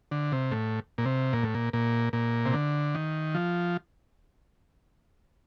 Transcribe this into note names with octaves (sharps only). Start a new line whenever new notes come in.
D3
C3
A2
A#2
C3
A#2
A2
A#2
A#2
A#2
C3
D3
D#3
F3